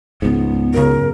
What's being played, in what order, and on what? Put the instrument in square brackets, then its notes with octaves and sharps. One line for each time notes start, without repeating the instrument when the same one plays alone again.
[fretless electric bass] C#2 G#2 [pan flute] B3
[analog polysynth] F#2 C#3 [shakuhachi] A#4